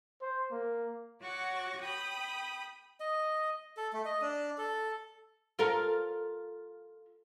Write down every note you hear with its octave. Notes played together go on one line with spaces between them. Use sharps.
C5
A#3
F#4 C#5 F#5 C#6 D6
G5 B5 D#6
D#5
A4
A3
D#5
D4
A4
F4 A4 A#4